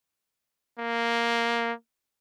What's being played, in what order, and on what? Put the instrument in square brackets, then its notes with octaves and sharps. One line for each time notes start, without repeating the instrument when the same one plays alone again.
[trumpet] A#3